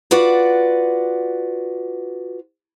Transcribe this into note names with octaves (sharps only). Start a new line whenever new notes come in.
F4 F#4 B4 D5 F#5